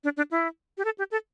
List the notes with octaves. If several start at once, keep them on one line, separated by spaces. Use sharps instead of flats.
D4
D4
E4
G4
A4
G4
A4